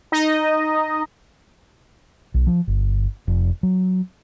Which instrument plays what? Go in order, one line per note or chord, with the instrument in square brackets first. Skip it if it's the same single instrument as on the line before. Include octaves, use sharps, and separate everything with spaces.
[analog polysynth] D#4 D#5
[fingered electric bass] B1
F3
G1
F1
F#3